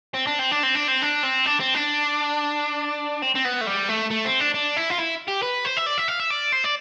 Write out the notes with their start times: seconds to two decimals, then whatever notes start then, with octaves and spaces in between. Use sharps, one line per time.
0.14 C4
0.27 D4
0.39 C4
0.51 D4
0.63 C4
0.75 D4
0.88 C4
1.03 D4
1.24 C4
1.47 D4
1.60 C4
1.75 D4
3.22 C4
3.35 C4
3.45 B3
3.61 A3
3.67 G3
3.89 A3
4.10 A3
4.25 C4
4.40 D4
4.54 D4
4.77 E4
4.90 F4
4.98 E4
5.28 G4
5.42 B4
5.65 C5
5.77 E5
5.86 D5
5.98 E5
6.08 F5
6.20 E5
6.31 D5
6.52 C5
6.64 D5